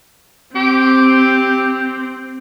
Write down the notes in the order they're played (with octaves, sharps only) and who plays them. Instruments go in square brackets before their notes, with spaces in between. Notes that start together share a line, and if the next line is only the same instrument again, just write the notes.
[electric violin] C4 [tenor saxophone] G4